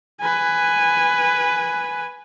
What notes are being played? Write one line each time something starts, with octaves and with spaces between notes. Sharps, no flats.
B4 G#5